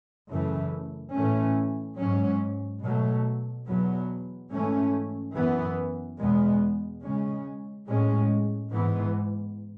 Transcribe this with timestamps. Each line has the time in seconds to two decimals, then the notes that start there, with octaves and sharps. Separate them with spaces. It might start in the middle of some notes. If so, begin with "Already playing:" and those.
0.30 F#2 C#3 E3 A3
1.14 A2 E3 A3 C#4
1.98 G#2 F#3 C#4
2.82 B2 F#3 A3
3.67 E2 B2 F#3 B3
4.51 G#2 E3 A3 C#4
5.34 F#2 E3 B3
6.19 E2 B2 G#3 B3
7.03 C#3 G#3 C#4
7.87 A2 G#3 C#4
8.71 G#2 E3 B3